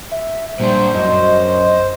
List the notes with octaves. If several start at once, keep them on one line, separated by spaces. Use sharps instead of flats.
E5
A#2 G3 D4 C5
F#2 D#5